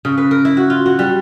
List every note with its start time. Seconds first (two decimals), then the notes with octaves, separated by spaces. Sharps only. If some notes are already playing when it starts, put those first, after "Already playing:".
0.05 C#3
0.17 B4
0.31 A#4
0.45 E4
0.57 F#4
0.70 F4
0.86 F#4
0.99 G3